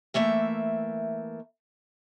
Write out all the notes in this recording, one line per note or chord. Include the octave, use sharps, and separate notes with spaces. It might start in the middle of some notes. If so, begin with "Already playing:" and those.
E3 A3 A#3 E5